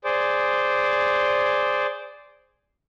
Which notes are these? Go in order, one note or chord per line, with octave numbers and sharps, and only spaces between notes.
G#4 C5 D5